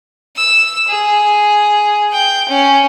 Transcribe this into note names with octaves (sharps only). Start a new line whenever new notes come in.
E6
G#4
G5
C#4